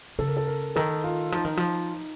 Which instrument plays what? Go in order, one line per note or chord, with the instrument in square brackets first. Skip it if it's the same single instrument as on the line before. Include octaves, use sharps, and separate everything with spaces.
[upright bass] C#3 [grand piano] A4
[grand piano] A#4
A4
A#4
[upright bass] D#3 [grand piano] A4
[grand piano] F4
[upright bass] F3 [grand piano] D#4
[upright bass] D#3
F3